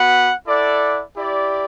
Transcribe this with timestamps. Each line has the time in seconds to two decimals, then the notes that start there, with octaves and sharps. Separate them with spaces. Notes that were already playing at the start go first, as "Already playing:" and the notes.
Already playing: B3 F#4 B4 F#5
0.45 E4 A4 D5 F#5
1.15 E4 G4 D5